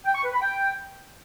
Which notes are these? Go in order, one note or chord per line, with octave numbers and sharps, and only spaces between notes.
G5
C#6
B4
B5
G5